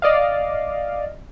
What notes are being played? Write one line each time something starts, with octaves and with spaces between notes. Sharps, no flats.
D5 D#5 F5